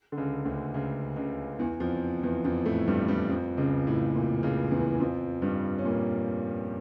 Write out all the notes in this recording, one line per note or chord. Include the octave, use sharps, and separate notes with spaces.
D3
C#2 C#3
D2 D3
C#2 C#3
C#2 C#3
E2 E3
F2 F3
E2 E3
F2 F3
A2 A3
G2 G3
G2 G3
F2 F3
C#2 C#3
A2
A#2
C#2 C#3
E2 E3
F2 F3
G2 G3
C#4
A#2 A#3